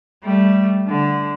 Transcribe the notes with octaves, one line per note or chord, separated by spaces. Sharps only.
G3 A3
D3